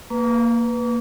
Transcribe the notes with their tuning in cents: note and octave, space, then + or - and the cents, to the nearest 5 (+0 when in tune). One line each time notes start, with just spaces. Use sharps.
A#3 +0 B4 +0 D6 -40